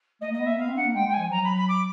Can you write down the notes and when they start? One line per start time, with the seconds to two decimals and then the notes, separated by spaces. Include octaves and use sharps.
0.21 A3 D#5
0.31 A#3
0.33 D#5
0.40 B3
0.46 A#3 E5
0.58 B3 F5
0.68 C4
0.76 D4 F#5
0.86 A#3
0.94 G#3 G5
1.06 G#3 G5
1.13 G#5
1.19 F3
1.31 F#3 A#5
1.43 B5
1.55 B5
1.68 D6